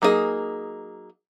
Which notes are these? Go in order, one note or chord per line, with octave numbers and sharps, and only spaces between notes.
F#3 A#3 D#4 E4 G#4